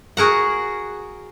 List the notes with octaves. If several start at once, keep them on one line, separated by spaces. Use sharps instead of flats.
F#4 G#4 A#4 F#5